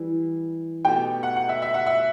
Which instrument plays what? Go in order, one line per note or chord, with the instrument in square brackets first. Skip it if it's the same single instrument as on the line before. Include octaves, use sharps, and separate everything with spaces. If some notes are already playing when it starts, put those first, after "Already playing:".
Already playing: [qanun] E3 G3
[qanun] B2 A3 D#4 G4 [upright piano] G5
[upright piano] F#5
F#5
E5
E5
F#5
E5